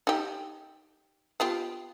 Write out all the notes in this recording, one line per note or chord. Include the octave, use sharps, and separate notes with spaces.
D#4 G4
B3 F4 G4